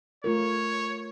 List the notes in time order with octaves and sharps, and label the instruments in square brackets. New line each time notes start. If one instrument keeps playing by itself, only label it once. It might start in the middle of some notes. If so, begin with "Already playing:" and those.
[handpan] A3 F4 A#4 [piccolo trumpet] C#5